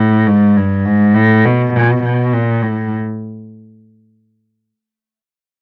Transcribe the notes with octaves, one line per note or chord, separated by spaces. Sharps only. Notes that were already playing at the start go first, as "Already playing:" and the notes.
Already playing: A2
G#2
G2
G#2
A2
B2
B2
B2
A#2
A2